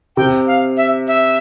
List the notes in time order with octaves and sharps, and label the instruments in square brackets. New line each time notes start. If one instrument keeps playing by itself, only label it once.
[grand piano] C3 [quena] G5
[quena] F5
E5
E5